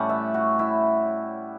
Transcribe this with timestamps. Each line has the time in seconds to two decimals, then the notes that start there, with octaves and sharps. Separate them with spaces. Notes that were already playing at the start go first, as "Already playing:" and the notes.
Already playing: A2 G3 C#4 F#5
0.09 E5
0.34 F#4
0.59 E4